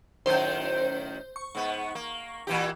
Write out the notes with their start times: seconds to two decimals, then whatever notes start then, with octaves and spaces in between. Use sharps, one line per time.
0.26 F#2 A2 D#3 C5 G6
1.36 C#6
1.55 G#2 B3
1.95 A#3
2.47 A#2 E3 G4